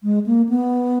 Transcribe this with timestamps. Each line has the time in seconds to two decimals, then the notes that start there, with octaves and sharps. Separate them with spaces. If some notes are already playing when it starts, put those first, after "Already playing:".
0.03 G#3
0.26 A#3
0.49 B3